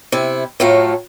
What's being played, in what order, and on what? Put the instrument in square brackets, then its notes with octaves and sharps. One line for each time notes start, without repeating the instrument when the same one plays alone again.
[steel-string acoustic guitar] C3 E4
A2 F3 F#3 A3 F5 A#5